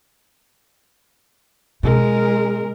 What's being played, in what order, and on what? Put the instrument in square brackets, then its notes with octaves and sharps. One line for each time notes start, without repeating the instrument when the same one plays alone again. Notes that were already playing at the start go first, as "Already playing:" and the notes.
[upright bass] B2 [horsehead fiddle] G#3 A#4